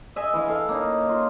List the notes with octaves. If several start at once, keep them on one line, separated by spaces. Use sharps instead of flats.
G#4 D#5 E5 G#5
E3 F5
A4 F5
A#3 C#4 D#4
F4